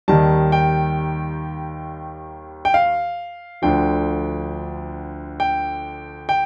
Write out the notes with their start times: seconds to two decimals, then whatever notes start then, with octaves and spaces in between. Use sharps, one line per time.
0.08 D#2 D#3 G3 A5
0.52 G5
2.65 G5
2.74 F5
3.62 D2 D3 F3 G5
5.40 G5
6.29 G5